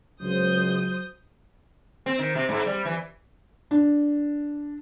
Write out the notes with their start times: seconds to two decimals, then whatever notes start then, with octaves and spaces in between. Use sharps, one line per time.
0.22 C#2 F#3 C5 D#6 G6
2.06 C4
2.19 D#3
2.35 C3
2.49 G#2
2.66 G3
2.85 E3
3.71 D4